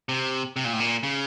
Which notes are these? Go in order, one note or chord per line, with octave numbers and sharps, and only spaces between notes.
C3
C3
A#2
A2
A#2
C#3